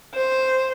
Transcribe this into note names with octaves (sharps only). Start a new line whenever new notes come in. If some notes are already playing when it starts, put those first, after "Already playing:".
C5